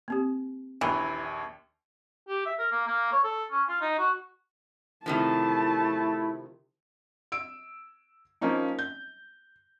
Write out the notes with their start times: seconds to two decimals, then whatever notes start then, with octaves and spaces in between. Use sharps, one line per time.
0.08 A#3 C4 G4
0.81 A#1 D#2 E3
2.28 G4
2.46 E5
2.59 A#4
2.72 A#3
2.87 A#3
3.12 C#5
3.24 A4
3.51 C#4
3.69 F4
3.81 D#4
3.98 F#4
5.06 C3 D#3 F3 A3 E4 A5
7.32 E6 D7
8.41 F3 A#3 C#4 D#4
8.79 G6